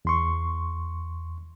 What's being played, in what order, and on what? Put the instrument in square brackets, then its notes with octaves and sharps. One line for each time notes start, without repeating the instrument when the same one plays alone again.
[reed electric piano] E2 C6 C#6